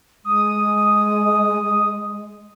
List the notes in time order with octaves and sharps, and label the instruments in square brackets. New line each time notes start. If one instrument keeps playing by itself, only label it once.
[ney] G#3 [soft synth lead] D#6